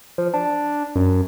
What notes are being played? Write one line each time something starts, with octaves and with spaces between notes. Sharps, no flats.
F3
D4
F#2